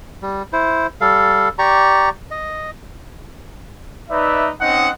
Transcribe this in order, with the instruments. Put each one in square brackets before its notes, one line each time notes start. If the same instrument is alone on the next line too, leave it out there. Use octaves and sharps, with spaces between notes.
[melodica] G3
E4 C5
G3 A4 F5
G4 D5 A#5 C#6
D#5
[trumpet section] D#4 B4 D5 E5
C4 C#4 D#4 D#5 F#5